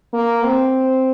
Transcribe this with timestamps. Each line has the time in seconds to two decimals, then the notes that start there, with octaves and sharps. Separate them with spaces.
0.13 A#3
0.44 C4